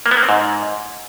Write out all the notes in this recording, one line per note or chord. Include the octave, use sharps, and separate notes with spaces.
A#3
B3
A#3
C4
G#2